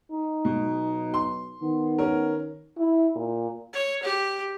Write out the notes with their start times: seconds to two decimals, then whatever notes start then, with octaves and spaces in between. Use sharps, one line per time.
0.11 D#4
0.45 B1 B2
1.14 C6
1.62 D#3 B3
1.98 C#4 A#4
2.77 E4
3.15 A#2
3.73 C#5
4.03 G4